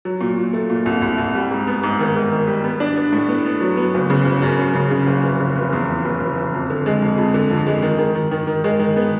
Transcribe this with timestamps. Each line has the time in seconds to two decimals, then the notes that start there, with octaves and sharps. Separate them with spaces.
0.05 F#3
0.21 A#2
0.37 A#2
0.53 A3
0.70 A#2
0.86 C2
1.02 C2
1.18 C2
1.35 G3
1.51 G#2
1.67 B3
1.83 G#2
2.00 D#3
2.16 G#2
2.32 D#3
2.48 G3
2.64 B3
2.80 D4
2.96 B3
3.12 A2
3.29 B3
3.45 B3
3.61 F#3
3.77 B3
3.94 F#1
4.10 C#3
4.26 F#1
4.42 F#2
4.59 F#2
4.75 C#3
4.91 C#3
5.07 F#1
5.24 F1
5.40 C#3
5.56 F1
5.73 E2
5.89 E2
6.05 F1
6.20 F1
6.37 F1
6.54 F2
6.70 D3
6.86 G#3
7.02 F2
7.17 F2
7.34 D3
7.50 F2
7.67 G#3
7.82 D#3
7.98 D#3
8.15 D#3
8.31 D#3
8.47 D#3
8.64 G#3
8.79 D#3
8.96 B3